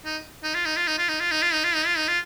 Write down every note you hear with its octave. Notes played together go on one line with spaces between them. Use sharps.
D#4
D#4
F4
D#4
F4
D#4
F4
D#4
F4
D#4
F4
D#4
F4
D#4
F4
D#4
F4